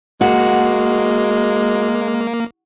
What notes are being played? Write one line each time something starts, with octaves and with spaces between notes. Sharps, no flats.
G#3 A#3 F#4